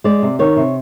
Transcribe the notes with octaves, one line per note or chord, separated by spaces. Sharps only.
G#3 D5
C3
D#3 C#5
C3